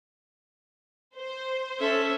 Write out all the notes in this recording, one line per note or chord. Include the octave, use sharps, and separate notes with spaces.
C5
C#4 A4 E5